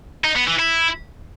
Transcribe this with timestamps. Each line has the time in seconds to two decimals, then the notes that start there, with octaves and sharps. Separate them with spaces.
0.24 D#4
0.36 B3
0.48 E3
0.59 E4